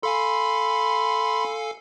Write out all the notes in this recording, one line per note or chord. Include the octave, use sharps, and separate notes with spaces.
A4 F5 G#5 B5 C6